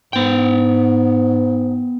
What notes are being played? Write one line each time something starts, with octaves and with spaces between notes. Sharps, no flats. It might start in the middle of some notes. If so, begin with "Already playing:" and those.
G#2 B3 G5